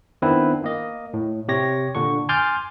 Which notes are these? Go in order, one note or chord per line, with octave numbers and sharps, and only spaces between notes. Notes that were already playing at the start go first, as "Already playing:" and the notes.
D#3 B3 C4 D4 E4 B4
A#3 D#5
A2
C3 G4 C#5 A#6
A#2 D3 D4 C#6
G#5 C6 D6 F6 G6 A6